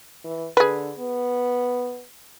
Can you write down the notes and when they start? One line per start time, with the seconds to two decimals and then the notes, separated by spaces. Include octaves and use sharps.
0.24 E3
0.57 D3 G#4 B4
0.99 B3